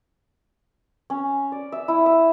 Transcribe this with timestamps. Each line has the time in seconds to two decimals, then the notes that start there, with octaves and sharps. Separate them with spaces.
1.10 C#4
1.52 D5
1.72 E5
1.88 E4
2.06 E5